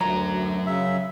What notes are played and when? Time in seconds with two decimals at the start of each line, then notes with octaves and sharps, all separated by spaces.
0.01 D2 F#3 A#4 A#5
0.67 C#3 E5